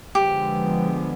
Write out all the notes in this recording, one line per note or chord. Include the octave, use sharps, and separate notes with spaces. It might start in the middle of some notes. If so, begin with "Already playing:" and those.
D3 F3 G#3 B3 G4